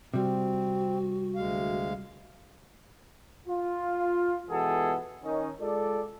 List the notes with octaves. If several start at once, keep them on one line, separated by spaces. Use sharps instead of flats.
C3 G3 C4 F#4
D2 G#3 F5
F4
B2 E3 G#3 B3 G#4 A4
D#3 C#4 D#4
G#3 F4 A4 D5